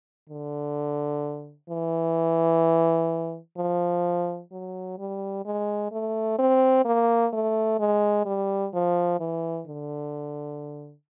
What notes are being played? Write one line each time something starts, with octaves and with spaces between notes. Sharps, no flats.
D3
E3
F3
F#3
G3
G#3
A3
C4
A#3
A3
G#3
G3
F3
E3
D3